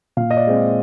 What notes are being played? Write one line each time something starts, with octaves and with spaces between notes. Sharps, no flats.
A#2 F5
D#5
D5
G#3 C4